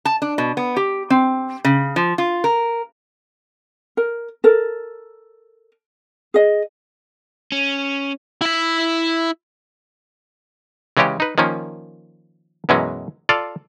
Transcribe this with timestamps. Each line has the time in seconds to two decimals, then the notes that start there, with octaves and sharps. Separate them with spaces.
0.05 A5
0.22 D4
0.38 B2
0.57 B3
0.77 G4
1.10 C4
1.65 C#3
1.96 F3
2.18 F4
2.44 A#4
3.97 A#4
4.44 A4 A#4
6.34 G#4 D#5
7.52 C#4
8.41 E4 E5
10.97 C#3 E3 G#3 C#4 G4
11.20 D#4 B4
11.38 D#3 F3 A#3 C#4
12.69 F#2 B2 E3 F#3 G#3 C#4
13.29 F4 A4 D5 F5